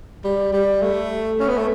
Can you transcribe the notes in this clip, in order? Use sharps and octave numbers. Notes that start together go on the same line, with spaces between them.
G3
G3
A3
C#4
B3
A3